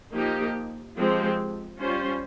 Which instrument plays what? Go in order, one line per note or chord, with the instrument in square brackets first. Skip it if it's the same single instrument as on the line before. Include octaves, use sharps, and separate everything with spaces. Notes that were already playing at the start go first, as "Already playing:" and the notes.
[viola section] F3 A#3 D#4 G4
F3 G#3 C4 G4
G3 C#4 F4 C5